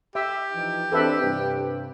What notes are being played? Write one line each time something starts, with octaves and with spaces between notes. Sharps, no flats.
G4 E5
E3 F3 D#4
E3 C4 D4 A4 B4 E5
G2 C3